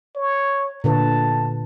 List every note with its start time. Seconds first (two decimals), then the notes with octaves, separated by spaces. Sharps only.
0.16 C#5
0.84 A#2 D3 B4 A5